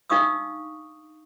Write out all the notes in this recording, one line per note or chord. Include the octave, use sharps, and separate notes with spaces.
D4 D#4 F5 C#6 D#6 E6